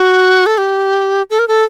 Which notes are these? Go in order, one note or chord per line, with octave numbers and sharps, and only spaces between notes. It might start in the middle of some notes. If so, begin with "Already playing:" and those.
Already playing: F#4
A4
G4
A4
A#4
A4